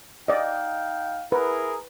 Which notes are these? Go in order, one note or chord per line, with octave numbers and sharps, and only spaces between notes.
D#4 D5 D#5 F5 G5
E4 G#4 A#4 B4